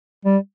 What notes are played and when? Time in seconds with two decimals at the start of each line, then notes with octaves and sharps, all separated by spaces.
0.25 G3